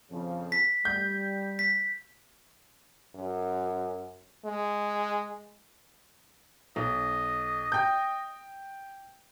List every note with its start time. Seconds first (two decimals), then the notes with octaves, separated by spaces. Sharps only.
0.11 F2 C#3 F3
0.52 B6
0.85 G3 G6
1.59 B6
3.15 F#2
4.45 G#3
6.76 B1 D#5
7.72 G5 G6